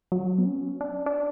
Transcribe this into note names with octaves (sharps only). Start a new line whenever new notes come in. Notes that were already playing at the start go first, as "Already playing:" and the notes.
F#3
B3
C#4
D4
D4